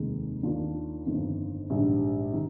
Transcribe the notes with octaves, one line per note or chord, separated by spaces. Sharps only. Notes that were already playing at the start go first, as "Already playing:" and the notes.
Already playing: F1 D#2 D#3 G#3
D#2 D#3 A#3 D4 F4
G1 F2 D#3 A#3
A#1 G#2 D#3 G3
D#3